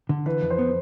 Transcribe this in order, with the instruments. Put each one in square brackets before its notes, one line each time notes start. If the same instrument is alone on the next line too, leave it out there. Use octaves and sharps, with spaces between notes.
[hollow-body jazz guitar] D3
[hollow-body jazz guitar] E3 [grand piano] B4
[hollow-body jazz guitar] F2
[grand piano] C5
[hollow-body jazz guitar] B3